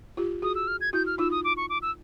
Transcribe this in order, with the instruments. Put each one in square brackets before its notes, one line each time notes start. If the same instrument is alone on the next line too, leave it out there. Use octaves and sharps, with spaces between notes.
[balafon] F4 G4
[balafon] F#4 G#4 [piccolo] D#6
[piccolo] E6
F6
G#6
[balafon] E4 F#4 [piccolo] G6
[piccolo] F6
[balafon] D#4 F4 [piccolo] E6
[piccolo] D#6
D6
C#6
D6
E6